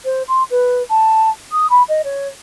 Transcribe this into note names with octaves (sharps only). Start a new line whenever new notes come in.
C5
C6
B4
A5
D#6
B5
D#5
C#5